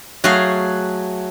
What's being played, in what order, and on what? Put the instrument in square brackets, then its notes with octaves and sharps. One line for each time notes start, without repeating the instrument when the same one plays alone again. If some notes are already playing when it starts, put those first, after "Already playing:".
[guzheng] F#3 A3 F#4 G#4 F5